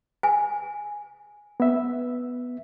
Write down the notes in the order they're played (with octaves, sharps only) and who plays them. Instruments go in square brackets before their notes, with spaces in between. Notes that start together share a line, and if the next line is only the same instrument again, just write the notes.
[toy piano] G#5
[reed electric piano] B3 E5